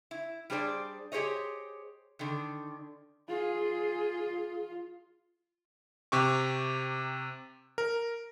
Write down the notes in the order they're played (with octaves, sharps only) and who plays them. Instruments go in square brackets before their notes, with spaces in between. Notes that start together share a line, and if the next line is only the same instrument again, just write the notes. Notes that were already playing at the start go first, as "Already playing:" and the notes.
[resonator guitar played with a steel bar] E4
G3 D4 G#4 C5 D5
G4 G#4 C5 C#5 D#5
D3 D#3
[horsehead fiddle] F4 [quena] G#4
[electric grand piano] C3 G4 C#6 D6
A#4